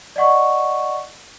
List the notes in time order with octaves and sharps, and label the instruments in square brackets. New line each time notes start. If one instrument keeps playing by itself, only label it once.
[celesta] D5 D#5 F#5 C#6